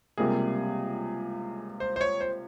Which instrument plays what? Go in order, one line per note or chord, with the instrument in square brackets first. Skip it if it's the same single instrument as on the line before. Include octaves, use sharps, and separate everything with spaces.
[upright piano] C#2 C3 G3 A#3 [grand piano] G#4
[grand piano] C5
C5
C#5
C5